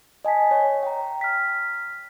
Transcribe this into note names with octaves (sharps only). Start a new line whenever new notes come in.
D#5 G#5 A5 B6
C#5
G5 A#5
F6 B6